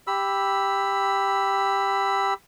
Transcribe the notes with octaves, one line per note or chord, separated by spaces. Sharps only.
G4 B5 E6